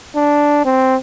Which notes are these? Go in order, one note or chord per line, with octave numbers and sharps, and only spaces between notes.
D4
C4